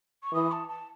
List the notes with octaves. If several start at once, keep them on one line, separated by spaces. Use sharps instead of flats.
C#6
E3 D#6
A5
A5